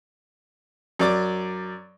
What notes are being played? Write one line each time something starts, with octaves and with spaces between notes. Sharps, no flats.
F#2 D5 D6